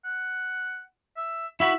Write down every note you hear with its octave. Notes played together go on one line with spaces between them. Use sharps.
F#5
E5
E4 F#4 E5 B5